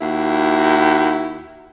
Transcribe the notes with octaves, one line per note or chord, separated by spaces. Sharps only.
D#2 E4 F#4